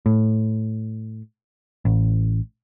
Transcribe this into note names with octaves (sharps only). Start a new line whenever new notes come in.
A2
A1